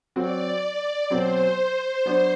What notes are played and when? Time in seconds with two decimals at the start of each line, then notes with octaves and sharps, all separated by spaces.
0.16 F#3 C4 F#4 D5
0.64 D5
1.10 B2 F#3 C4 C5
2.06 F#3 B3 D4 F#4